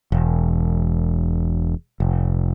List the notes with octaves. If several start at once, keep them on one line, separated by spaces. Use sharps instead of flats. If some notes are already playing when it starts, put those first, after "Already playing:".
E1
F1